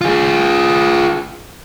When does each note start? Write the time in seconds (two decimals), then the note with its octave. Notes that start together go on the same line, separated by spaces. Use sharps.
0.01 F4 G#4